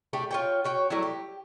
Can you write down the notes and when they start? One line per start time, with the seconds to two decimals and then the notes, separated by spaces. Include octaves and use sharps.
0.13 A3 D4 G4
0.31 F4 C#5 G5
0.64 F#4 C#5 G5
0.90 F#3 G3 A3 E4
1.03 G4